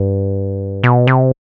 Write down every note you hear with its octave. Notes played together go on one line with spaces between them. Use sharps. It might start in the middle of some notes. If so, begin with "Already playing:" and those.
Already playing: G2
B2
C3